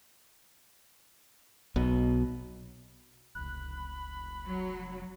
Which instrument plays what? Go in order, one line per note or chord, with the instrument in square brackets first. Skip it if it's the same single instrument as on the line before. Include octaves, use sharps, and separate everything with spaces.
[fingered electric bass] B1 B2
[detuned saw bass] F1 [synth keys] C#2 F#6 [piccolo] B5
[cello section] F#3